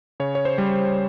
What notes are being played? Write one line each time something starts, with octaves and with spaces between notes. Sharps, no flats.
C#3 C#5
C#5
C5
G3